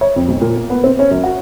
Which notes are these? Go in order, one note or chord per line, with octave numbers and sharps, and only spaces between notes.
C#5
F2
B1
A#2
A#3
B3
C4
C#4
F#2
F#4